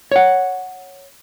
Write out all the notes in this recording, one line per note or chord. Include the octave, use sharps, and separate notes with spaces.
C#5 F#5